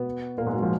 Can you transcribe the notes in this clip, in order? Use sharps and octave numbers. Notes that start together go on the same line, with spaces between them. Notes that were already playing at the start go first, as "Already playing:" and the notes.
Already playing: B2 B3
A#2 A#3
G#2 G#3
F#3
F3